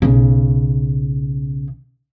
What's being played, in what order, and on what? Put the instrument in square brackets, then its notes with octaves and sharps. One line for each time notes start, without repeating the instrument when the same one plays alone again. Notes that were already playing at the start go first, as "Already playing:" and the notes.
[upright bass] B1 C#3